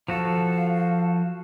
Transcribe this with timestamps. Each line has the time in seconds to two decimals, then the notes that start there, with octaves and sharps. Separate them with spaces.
0.08 F3 F#4 A4 F5